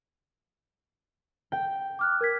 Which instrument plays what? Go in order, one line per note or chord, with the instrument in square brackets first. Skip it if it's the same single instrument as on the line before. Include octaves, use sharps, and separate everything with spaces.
[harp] G5
[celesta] D6 F6 F#6
A#4 G#6 B6